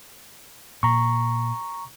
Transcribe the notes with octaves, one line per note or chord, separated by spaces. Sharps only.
A#2 A#5 C#6